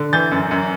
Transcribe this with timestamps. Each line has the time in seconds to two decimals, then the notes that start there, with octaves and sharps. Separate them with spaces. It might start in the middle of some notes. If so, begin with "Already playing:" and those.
Already playing: D3
0.13 E3 G6 A6
0.32 F#2
0.51 F#2